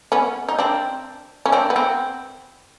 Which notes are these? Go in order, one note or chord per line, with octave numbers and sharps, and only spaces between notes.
B3 C#4
D#4
C4 D4
C#4
C4 D4
B3
C4